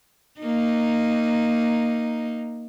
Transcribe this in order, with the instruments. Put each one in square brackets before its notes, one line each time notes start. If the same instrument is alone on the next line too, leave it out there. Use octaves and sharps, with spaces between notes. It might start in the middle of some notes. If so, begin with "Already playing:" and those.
[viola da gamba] A#3 D#4